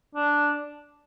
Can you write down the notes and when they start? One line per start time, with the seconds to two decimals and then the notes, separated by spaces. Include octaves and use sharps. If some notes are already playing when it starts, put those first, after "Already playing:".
0.15 D4